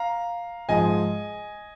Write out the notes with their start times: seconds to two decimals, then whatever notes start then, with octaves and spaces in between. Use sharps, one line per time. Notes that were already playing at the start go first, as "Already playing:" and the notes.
Already playing: F5 A#5
0.69 G#2 F3 G#3 D#5 G#5